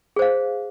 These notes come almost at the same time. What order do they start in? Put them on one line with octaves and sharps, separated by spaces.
G#4 C5 F5